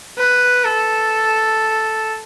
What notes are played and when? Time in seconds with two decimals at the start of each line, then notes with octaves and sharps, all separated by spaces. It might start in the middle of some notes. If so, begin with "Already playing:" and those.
0.18 B4
0.65 A4